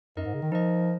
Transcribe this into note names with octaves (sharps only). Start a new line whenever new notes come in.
F#2 D#4 A#4 D#5
G#2
C#3
D#3
F3 D#4 A#4 D#5